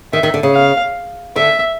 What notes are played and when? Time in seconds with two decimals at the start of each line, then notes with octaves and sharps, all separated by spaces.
0.13 D#3 E5
0.23 D#3
0.34 D3
0.43 C#3
0.54 F5
1.36 D3 E5